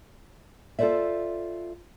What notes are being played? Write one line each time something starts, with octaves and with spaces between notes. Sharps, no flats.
F4 A4 B4 C5 D5 E5